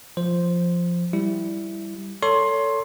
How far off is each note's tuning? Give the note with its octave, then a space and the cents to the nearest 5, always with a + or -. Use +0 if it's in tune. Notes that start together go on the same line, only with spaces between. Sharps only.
F3 +0 C5 +0
G3 +0 E4 +0
A4 +25 C#5 +25 C6 +15